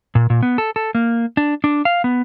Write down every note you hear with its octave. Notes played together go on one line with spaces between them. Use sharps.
A#2
A#2
B3
A4
A4
A#3
D4
D4
F5
B3